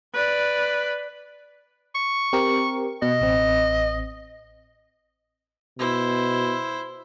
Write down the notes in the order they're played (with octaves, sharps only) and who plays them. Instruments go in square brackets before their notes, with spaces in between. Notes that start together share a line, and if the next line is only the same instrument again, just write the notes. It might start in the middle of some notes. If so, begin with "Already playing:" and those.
[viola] B4 D5
[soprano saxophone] C#6
[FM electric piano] C4 G4 A#4
[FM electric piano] B2 [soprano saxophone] D#5
[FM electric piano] A1 C4
[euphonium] B2 [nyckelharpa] E4 C5